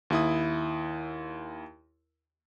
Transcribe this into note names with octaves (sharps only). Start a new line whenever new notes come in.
D#2 E4 D#6